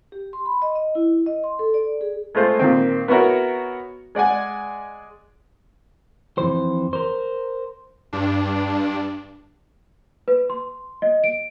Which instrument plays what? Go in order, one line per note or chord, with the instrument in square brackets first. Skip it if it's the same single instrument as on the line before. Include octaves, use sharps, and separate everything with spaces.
[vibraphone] G4
C6
B5
D#5
D#5
E4
D#5
C6
A4
D5
G#4
[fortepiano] G#3 A3 F4 C5
A#2 D#3 C4
B3 E4 F#4 A#4 C#5
G#3 D5 F#5 G#5
[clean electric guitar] F2 E3 C5
A#4 C5
[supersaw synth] G2 D4
[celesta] B4
C6
D#5
D7